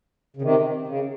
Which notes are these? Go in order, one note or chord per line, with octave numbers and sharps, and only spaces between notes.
C#3
C3 D#3
C#3